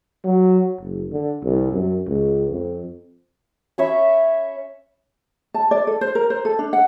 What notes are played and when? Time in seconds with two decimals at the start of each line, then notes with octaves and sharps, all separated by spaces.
0.24 F#3
0.81 F#1
1.12 D3
1.44 C2
1.72 F#2
2.08 C#2
2.51 F2
3.78 C#4 C#5 E5 B5
5.54 A5
5.71 D5
5.87 A4
6.01 C5
6.15 A#4
6.30 C5
6.45 A4
6.59 D4
6.73 F#5